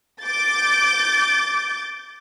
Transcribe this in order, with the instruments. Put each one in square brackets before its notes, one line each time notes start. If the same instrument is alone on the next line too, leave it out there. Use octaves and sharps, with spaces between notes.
[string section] D6 G6 A6